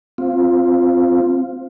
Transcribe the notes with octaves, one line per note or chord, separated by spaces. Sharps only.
C4 F4